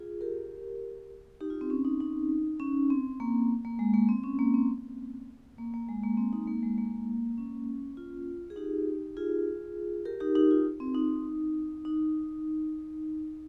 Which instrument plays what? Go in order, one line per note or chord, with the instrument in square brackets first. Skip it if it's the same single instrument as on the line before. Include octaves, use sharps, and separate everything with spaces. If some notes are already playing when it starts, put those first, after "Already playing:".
Already playing: [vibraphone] F4 G#4
G4 A#4
D#4 G4
F4
C4
C#4
D#4
D#4
C#4
C4
A#3
A#3
G#3
A#3
C4
C#4
A#3
C4
A#3
A#3
G#3
A#3
C4
D#4
A#3
G#3
A#3
C#4
F4
G#4
D#4 G4
F4 G#4
G4 A#4
D#4 G4
D#4 G4
F4
C4
D#4
D#4